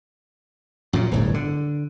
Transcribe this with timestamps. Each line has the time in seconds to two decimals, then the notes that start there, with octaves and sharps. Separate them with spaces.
0.93 F#2 A#2 C#3
1.12 D1 G1 A2
1.34 D3